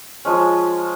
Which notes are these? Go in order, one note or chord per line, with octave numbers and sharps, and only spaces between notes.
F3 G#3 C#4